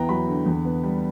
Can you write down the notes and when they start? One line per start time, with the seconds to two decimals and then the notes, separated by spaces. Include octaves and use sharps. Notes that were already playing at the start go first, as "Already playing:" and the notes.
Already playing: E2 E3 B3 G5 A#5
0.09 F#3 B5
0.28 D3
0.46 E2
0.65 B3
0.83 G3